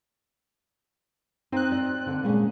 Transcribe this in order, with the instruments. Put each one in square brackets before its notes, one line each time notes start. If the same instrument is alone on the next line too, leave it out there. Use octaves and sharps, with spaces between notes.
[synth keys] C4 F#6 [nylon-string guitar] D#4 C5
[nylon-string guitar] D5 D#5
D3
A#2 G#3 C#4